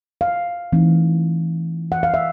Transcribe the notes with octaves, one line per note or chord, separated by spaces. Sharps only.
F5
E3 A3 C4 D#4
F#5
F5
E5